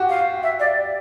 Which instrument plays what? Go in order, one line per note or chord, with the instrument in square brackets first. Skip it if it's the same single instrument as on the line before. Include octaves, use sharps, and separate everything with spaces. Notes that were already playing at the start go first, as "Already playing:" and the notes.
Already playing: [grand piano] F#4 G4
[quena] F5
E5
D5